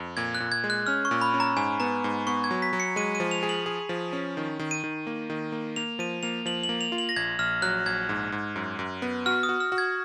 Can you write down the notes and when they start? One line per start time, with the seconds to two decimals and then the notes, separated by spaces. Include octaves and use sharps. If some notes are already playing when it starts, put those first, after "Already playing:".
Already playing: F2
0.17 A#2 G#6
0.35 F#6
0.40 A#2
0.52 G#6
0.64 G#3
0.70 F#6
0.86 C#4 F6
1.05 C#6
1.11 A#2
1.21 B5
1.34 C#4
1.40 A#5
1.56 G#2 G#5
1.80 B3 A#5
2.04 G#2
2.27 B3 C#6
2.44 G#6
2.51 F#3
2.62 B6
2.73 F#3
2.80 C#7
2.96 G#3 D#7
3.15 D#7
3.20 F3
3.31 F7
3.43 G#4
3.49 F#7
3.66 G#4
3.89 F3
4.13 C#4
4.37 D#3
4.59 D#3
4.71 D#7
4.84 D#3
5.07 A#3
5.30 D#3
5.52 A#3
5.76 A#3 F7
5.99 F3 D#7
6.23 A#3 F7
6.46 F3 F#7
6.63 F#7
6.69 A#3
6.81 F7
6.92 F4
6.98 F#7
7.09 A#6
7.16 A#1 G#6
7.39 A#1 F6
7.62 F#3 F#6
7.86 A#1 G#6
8.09 G#2
8.32 G#2
8.56 F#2
8.79 F#2
9.02 B3
9.26 F#4 F6
9.43 D#6
9.49 F#4
9.60 F6
9.72 F#4
9.78 G#6